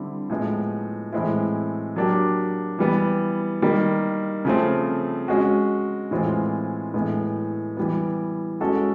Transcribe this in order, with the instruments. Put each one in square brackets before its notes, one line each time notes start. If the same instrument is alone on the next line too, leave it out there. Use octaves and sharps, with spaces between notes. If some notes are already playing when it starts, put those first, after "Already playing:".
Already playing: [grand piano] D3 G3 C4 E4
A2 F3 G#3 B3
A2 E3 G#3 C4 E4
F#3 A#3 D4 G4
E3 G3 B3
D#3 G3 A#3
C#3 F3 A3 C4
G#3 C#4 F#4
A2 E3 G#3 C4 F4
A2 E3 G#3 B3
E3 G3 B3
G#3 C#4 F#4 A4